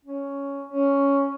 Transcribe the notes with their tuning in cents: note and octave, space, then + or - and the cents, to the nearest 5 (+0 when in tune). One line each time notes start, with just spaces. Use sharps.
C#4 +5
C#4 +5